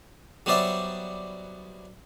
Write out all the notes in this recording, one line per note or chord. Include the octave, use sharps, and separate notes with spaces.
F#3 G3 B3 C5 D5 E5